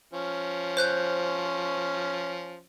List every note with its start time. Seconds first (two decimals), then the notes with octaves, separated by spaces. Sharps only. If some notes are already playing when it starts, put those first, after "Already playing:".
0.13 F3 C#4
0.77 C5 F#6 G6